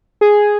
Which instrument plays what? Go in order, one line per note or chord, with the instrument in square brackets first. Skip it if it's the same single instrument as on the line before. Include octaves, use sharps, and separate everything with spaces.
[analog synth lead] G#4